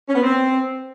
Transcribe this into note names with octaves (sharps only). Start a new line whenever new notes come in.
C#4
B3
C4